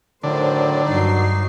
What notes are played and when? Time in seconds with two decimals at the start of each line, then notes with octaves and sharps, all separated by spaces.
0.23 A2 D3 D#3 F#3 C5
0.86 G2 F#3 D#4 C7